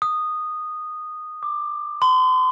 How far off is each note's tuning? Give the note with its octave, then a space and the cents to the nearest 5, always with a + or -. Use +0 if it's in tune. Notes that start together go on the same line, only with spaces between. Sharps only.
D#6 -10
D6 +15
C6 -40